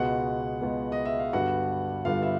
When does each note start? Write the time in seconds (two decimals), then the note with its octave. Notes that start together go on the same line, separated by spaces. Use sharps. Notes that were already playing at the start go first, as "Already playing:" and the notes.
Already playing: C#2 B2 G#3 B3 F#4 F#5
0.61 C#2 B2 G#3 B3
0.92 D#5
1.05 E5
1.19 F5
1.33 G2 D3 G3 B3 F#4 F#5
2.05 G2 D3 G3 B3 F4 F5
2.23 E5